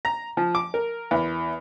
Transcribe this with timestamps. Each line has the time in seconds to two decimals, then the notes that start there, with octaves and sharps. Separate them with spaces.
0.05 A#5
0.37 F3
0.55 D6
0.74 A#4
1.11 E2